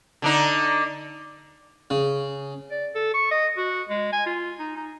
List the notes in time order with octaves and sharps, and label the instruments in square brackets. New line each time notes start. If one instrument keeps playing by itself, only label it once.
[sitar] D3 D4 D#4
[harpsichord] C#3
[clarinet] D5
A4
C#6
D#5
F#4
G#3
G#5
F4
D#4
D#4